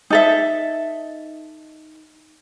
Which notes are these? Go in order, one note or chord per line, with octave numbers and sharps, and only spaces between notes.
D#4 A4 E5